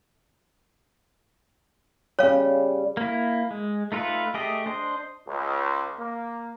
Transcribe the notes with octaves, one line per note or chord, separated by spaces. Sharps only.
C#3 G3 C#5 F5
A#3 E4
G#3
A3 D#4 F4 A4 B4
A3 G4 G#4 D#5
D4 C5 D#5
C#2
A#3